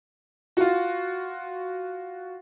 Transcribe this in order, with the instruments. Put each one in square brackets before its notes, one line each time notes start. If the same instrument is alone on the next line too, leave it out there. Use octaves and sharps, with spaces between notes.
[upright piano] F4 F#4